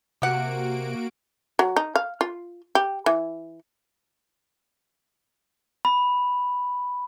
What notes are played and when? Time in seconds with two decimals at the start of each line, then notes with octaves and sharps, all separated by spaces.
0.22 C3 A#3 F#4 G4 F#5 D7
1.59 F#3
1.76 D#4
1.96 F5
2.21 F4
2.75 G4
3.06 E3
5.85 B5